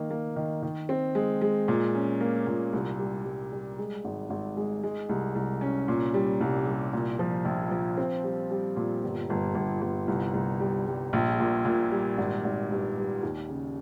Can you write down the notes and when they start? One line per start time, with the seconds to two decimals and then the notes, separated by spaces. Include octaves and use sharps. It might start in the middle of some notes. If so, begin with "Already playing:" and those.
Already playing: D#3 A#3
0.10 A#3
0.36 D#3
0.62 D#3
0.89 C4
1.15 G#3
1.41 G#3
1.68 A#2
1.94 C#4
2.21 A#3
2.47 A#2
2.73 C2
2.99 G3
3.25 G3
3.52 G3
3.79 G#3
4.04 G#1
4.30 G#1
4.57 G#3
4.83 G#3
5.09 C2
5.35 C2
5.61 C#4
5.88 A#2
6.14 G3
6.41 C2
6.66 G3
6.93 A#2
7.19 F3
7.45 A#1
7.71 F3
7.97 C4
8.24 G3
8.51 G3
8.76 A#2
9.03 G1
9.30 G1
9.55 G1
9.81 G1
10.08 C2
10.34 C2
10.60 G3
10.87 G3
11.13 A#1
11.40 A#2
11.65 A#2
11.91 G3
12.18 G#1
12.44 G#1
12.71 G2
12.97 G2
13.23 D#2
13.49 C#3